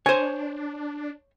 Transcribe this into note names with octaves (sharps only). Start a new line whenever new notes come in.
D4 C5 C#5 G#5